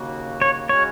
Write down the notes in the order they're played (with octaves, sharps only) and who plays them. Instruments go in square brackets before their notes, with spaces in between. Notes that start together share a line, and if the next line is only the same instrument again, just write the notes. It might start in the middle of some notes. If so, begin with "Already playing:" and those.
Already playing: [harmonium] D#2 C#3 A#3 F#4
[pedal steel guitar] C#5
[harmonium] C#3 G#3 C#4 F#4 [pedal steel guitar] C#5